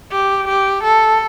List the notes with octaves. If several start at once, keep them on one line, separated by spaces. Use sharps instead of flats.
G4
G4
A4